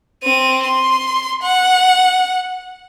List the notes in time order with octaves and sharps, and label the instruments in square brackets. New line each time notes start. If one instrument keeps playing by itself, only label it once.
[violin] C4 D#7
C6
F#5